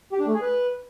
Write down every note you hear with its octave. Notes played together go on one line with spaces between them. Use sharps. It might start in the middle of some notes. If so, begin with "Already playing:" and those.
G4
D4
A3
G#4
B4